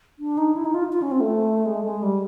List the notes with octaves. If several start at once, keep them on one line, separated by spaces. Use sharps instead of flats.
D4
D#4
E4
D#4
F4
F4
C#4
C4
A3
G#3
G#3
G3